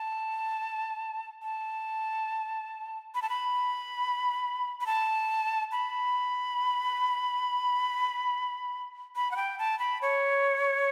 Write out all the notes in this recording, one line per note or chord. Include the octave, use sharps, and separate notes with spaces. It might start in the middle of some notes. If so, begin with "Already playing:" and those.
Already playing: A5
A5
B5
A5
B5
B5
A5
B5
B5
F#5
G5
A5
B5
C#5